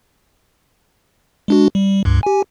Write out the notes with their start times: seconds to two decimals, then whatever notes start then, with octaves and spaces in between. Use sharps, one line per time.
1.48 G#3 D4 F#4
1.75 G3
2.05 C#2 G2
2.23 G4 G#5